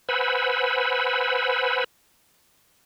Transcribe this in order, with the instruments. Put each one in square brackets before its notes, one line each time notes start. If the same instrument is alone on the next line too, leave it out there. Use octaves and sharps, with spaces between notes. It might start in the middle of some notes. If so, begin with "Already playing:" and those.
[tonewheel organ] B4 C5 F#5 G#5 B5 E6